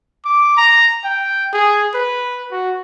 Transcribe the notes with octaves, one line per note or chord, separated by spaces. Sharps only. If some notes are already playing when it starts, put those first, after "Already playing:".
D6
A#5
G5
G#4
B4
F#4